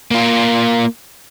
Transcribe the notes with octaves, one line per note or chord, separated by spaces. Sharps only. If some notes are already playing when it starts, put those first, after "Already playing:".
A#3 F4